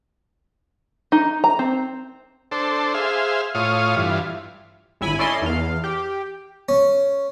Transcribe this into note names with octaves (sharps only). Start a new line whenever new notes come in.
D#4
A#5
C4
D4 A4 C5
G#4 C5 E5 F5
A2 F4 C#5 F5 D#6
G2 E3 F4
G#1 E4 G#5 B5
C#4 E4 A4 D5 D#5 C6
E2 F5
G4
C#4